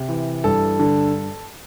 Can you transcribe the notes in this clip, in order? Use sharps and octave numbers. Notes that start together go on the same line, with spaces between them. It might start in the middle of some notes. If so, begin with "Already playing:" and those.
Already playing: C3
E3
G2 A4
D3